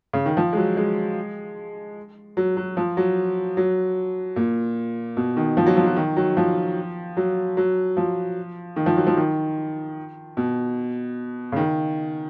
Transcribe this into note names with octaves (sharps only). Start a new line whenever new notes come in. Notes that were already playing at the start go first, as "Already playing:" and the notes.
C#3
D#3
F3
G#3
F#3
G#3
F#3
F#3
F3
F#3
F#3
A#2
B2
D#3
F3
F#3
F3
F#3
D#3
F#3
F3
F#3
F#3
F3
D#3
F3
F#3
F3
D#3
B2
C#3
D#3